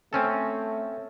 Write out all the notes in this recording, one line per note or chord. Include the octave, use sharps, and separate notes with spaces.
A3 C4 C#4 A4